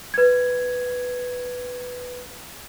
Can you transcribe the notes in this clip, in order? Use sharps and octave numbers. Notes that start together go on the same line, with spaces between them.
B4 G#6